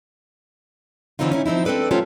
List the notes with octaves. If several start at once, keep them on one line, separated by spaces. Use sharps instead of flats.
D3 E3 C4 C#4 D#4 F4
C#4 D#4 E4
F3 C4 D#4 E4
C4 D4 A4 B4 D5
C3 F3 A3 C#4 F4 G4